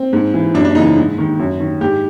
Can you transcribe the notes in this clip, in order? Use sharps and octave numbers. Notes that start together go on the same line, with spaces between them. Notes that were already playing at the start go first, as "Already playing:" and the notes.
Already playing: C4
G#2
E3
F#2 D4
D4
C#3 E3 D#4
G#2
D#3
F#2
D#3
G#2 G4